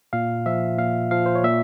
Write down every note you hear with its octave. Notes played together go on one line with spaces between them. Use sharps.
A#2 F5
F3 E5
A#2 F5
F3 F5
C5
C#5
A#2 E5